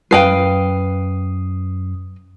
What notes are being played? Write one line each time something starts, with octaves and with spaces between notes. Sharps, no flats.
F#2 B4 F5 G5 D#6 C7